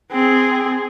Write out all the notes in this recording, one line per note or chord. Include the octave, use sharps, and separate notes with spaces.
C4 G#4